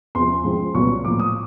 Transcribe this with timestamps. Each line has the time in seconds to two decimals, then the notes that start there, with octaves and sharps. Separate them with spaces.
0.15 E2 C3 F3 C6
0.44 G#2 F3 G#3 C4
0.74 C2 A#2 F#3 B3 C#6
1.04 A2 F3 A#3 D6
1.19 D#6